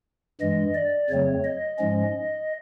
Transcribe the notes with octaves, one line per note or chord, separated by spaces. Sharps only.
G2 E3 G#3 D#5
D5
F2 C#3 F#3 A3 C4 C#5
D#5
G#2 F3 G#3 C#4